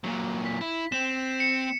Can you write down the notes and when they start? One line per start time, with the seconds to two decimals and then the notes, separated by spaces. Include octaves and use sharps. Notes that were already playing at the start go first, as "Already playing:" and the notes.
0.04 A#2 F#3
0.45 B6
0.61 E4
0.92 C4 E7
1.40 C#7